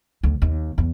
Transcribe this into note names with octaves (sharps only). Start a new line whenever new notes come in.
D2
D#2
E2